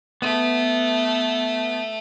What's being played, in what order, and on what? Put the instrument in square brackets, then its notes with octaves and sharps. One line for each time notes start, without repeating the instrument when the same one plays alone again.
[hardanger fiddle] A3 [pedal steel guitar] B3